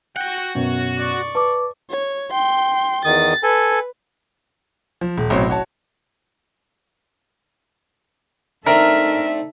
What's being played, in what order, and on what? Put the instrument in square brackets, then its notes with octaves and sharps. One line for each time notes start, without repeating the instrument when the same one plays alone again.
[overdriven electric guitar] F#4 F#5 [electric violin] G5
[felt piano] F#2 B2 [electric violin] C#5
[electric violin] D5 C#6
[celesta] B4 D6 [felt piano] A5
[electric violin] C#5
G5 C6
[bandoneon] E2 D#3 D#6 [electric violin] A6
[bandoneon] A4 G#5 [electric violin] B4
[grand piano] F3
D#1
A1 B2 F#3 C4 C#5
F#4 C#5 A5
[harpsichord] A3 C4 D4 [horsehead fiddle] D#4 A4 [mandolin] A#4 [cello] E5